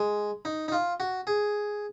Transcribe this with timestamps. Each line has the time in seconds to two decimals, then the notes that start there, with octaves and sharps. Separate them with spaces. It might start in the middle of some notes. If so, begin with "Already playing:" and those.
Already playing: G#3
0.45 D#4
0.68 D#4
0.72 F4
1.00 F#4
1.27 G#4